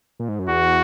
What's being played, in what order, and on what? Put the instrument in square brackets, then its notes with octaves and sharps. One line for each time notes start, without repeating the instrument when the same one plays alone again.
[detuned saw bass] A#2
G#2
F#2
[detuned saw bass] E2 [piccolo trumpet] F#4